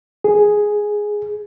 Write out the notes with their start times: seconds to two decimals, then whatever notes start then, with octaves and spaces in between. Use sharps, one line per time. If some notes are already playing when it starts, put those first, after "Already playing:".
0.24 G#4